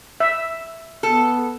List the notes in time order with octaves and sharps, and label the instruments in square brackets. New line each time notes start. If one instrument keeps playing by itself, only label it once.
[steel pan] E5
[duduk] B3 [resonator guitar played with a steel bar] A4